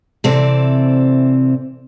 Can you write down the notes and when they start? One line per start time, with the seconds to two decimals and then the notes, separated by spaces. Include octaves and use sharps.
0.24 C3 E3 C4 A4 D5